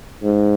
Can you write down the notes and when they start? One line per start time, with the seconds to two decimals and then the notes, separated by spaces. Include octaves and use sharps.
0.24 G#2